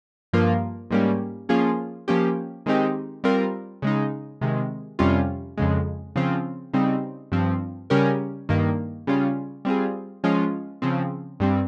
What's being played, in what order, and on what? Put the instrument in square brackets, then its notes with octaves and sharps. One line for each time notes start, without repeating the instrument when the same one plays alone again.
[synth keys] G2 F3 A#3 F4 A#4
G#2 G3 A#3 C#4 G4
F3 A#3 C#4 F4 G#4
F3 A#3 C#4 G4
D#3 G#3 C4 D#4 G4
G3 C4 F4 A#4
C#3 G#3 D#4
C3 D#3 G#3
F2 C3 G3 C#4 F4
F2 C#3 G#3
C#3 F3 C4 F4
C#3 G3 C4 D#4
G2 F3 C4
C#3 G3 C#4 G4 A#4
G2 D#3 A#3
C#3 G3 C#4 F4
G3 C4 F4 G#4
F3 G#3 C#4 F4
C#3 F3 C4
G2 G3 C4